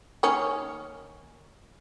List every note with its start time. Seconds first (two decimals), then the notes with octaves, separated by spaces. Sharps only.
0.23 D#3 A#3 C#4